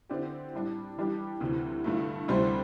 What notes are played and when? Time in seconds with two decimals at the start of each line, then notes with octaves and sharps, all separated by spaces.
0.09 D3 C4 E4 G4 D5
0.53 A2 G3 D4
0.98 E3 G3 D4 G4
1.40 D2 C3 E3
1.84 G2 D3 A3 E4
2.28 D2 C3 G3 E4 C5